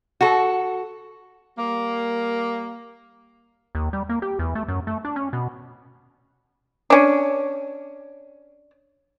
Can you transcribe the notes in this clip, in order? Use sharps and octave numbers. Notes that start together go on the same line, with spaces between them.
F#4 A4
G3 A#3
D#2
G3
A#3
G4
E2
A3
F#2
A3
D4
C#4
B2
C#4 D4